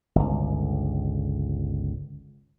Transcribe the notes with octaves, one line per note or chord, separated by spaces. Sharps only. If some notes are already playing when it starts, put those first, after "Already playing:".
G1 C#2